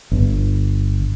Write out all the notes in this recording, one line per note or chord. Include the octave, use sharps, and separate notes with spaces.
G1